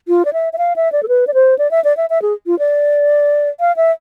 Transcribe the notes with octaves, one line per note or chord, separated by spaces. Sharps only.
F4
D5
E5
E5
F5
E5
D5
A4
B4
D5
C5
D5
E5
D5
E5
E5
G#4
F4
D5
F5
E5